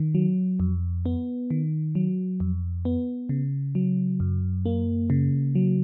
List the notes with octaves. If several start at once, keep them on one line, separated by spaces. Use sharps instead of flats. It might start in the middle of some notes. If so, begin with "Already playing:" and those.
Already playing: D#3
F#3
F2
B3
D#3
F#3
F2
B3
C#3
F#3
F#2
A#3
C#3
F#3